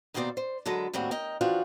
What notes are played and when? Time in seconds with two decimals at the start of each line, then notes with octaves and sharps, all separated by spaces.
0.14 D#2 B2 C4 D#4 C5 D5
0.37 C5
0.66 D3 F#3 G#3 A4 B4 A#5
0.93 D#2 A2 G3 C4 F#4
1.11 A#4 D#5 G5
1.41 E3 F3 D4 F4 F#4 G5